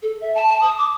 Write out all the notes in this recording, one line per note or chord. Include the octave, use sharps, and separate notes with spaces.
A4
E5
A5
A5
D#6
D6